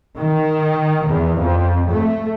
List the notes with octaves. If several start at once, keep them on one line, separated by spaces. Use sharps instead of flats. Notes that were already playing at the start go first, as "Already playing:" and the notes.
D#3
E2
F2
A3